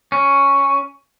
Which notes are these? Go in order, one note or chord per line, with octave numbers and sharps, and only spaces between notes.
C#4